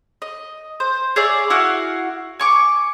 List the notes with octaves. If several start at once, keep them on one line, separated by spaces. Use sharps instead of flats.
D#5
C5
G#4 C#5 D5 E5
E4 F#4 F5 F#5
G#5 C#6 D6